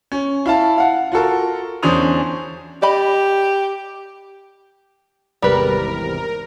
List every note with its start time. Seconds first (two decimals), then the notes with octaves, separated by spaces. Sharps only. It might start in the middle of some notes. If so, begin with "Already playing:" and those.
0.12 C#4
0.46 E4 F5 A5
0.78 F5 F#5
1.12 F4 F#4 A4 A#4
1.83 E2 C#4 D4 C5 D#6 F7
2.82 G4 D5 D#5 B5
5.42 G#1 E2 C3 G3 A#4 B4